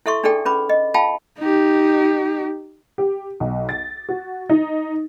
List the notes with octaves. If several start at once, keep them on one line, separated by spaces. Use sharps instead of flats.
E4 A4 E5 C6 C#6
D4 D#4 G#4 A4 D5 G5
C#4 B4 B5 D6
D#5
F4 F5 G5 A5 B5
D#4 G4
G4
B1
A6
F#4
D#4